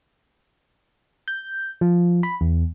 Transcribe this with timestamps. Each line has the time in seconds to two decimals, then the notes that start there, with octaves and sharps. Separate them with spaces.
1.28 G6
1.81 F3
2.23 B5
2.41 E2